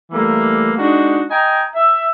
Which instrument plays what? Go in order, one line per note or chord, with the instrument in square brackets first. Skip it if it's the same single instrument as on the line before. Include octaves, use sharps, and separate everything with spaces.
[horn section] E3 G3 A3 A#3
G#3 D4 D#4 F#4
D#5 G5 G#5 A#5
E5